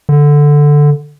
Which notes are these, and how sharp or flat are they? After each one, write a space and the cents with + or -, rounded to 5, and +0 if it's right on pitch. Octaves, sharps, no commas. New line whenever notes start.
D3 +0